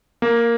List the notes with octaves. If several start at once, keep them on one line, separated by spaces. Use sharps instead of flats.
A#3